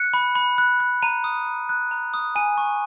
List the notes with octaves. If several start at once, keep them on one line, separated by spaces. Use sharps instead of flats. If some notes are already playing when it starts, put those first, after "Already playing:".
Already playing: F#6 C#7
B5
B5
F#6
F#6
A#5 D#7
D#6
A#5
F#6
A#5
D#6
G#5 D#7
C#6